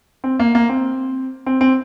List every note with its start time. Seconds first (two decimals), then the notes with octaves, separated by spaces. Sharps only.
0.24 C4
0.39 A#3
0.55 A#3
0.69 C4
1.46 C4
1.61 C4